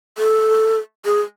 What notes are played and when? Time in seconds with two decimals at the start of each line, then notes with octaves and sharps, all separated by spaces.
0.18 A4
1.05 G#4